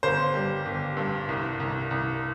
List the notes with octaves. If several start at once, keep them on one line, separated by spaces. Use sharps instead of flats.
G1 C5
G3
G1
G2
C2
C2
C2